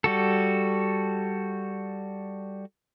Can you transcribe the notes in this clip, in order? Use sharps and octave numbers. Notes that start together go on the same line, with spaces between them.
G3 F#4 A4